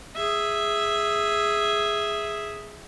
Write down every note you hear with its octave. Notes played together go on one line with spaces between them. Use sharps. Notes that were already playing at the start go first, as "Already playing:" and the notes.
G#4 E5